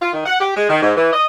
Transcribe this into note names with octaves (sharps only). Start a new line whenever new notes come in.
F4
D#3
F#5
G4
G#3
D#3
G#2
E3
D#5